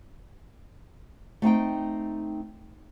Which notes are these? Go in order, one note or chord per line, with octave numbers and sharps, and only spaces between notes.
A3 C4 D#4 G5